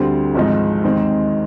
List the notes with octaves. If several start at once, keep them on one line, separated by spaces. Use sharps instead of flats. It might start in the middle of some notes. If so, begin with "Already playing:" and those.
Already playing: D2 D3 G3 C4
G#1 G#2 F3 G#3 D#4
D#2 D#3 G#3 C4